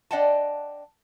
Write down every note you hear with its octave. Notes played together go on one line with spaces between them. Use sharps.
D4 D5 D#5 F#5 G5 A5